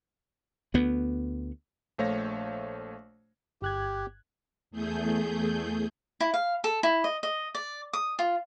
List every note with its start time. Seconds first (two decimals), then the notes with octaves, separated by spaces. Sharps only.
0.74 D2 B3
1.98 A#1 A3 C5 C#5 F5 A#6
3.62 G1 G4 F#6 G#6
4.71 E2 A3 G#4 G6
6.20 E4
6.34 F5
6.64 A4
6.83 E4
7.04 D#5
7.23 D#5
7.55 D5
7.93 D#6
8.19 F4